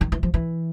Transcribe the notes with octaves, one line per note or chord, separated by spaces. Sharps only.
D#3
E3
F3
E3